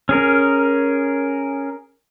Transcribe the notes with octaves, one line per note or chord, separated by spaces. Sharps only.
C#4 G#4 A#4